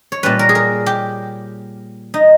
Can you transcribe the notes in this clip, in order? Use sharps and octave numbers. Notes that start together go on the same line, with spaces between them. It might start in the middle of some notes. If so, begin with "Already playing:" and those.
C#5
A#2 G3 C#4 B4
A#4
G#4
A#4
G4
D#4